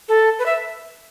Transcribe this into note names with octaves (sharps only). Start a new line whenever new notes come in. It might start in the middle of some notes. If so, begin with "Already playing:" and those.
A4
B4
E5